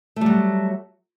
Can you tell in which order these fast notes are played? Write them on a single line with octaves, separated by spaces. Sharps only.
A3 G3 F#3